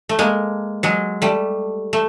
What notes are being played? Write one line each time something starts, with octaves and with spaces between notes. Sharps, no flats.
A3
G#3 A#3
F#3 G#3
G3 A3
A3